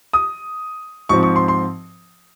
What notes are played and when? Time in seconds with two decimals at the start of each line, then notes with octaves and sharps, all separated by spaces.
0.13 D#6
1.09 G#2 F3 C4 C#6
1.23 C#6
1.36 C6
1.48 C6